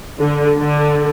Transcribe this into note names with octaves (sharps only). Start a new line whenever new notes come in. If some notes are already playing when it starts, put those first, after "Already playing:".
D3
D3